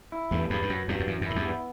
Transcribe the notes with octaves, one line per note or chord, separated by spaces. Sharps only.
E4
E2 G2 A3
E2 G2 B4
G2
F#2 F#3
E2 G2 F#3
E2
F#2 E3
F#2
A2 E4
E2 G2
B3